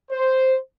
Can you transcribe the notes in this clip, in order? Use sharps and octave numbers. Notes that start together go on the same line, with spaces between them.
C5